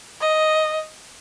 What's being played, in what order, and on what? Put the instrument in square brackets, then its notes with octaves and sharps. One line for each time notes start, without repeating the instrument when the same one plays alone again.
[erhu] D#5